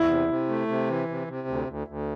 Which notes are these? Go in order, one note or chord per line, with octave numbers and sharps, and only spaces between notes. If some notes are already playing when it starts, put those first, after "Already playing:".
Already playing: E2 E4
C3
C3
A3
C3
E3
C3
C3
D2
D2
D2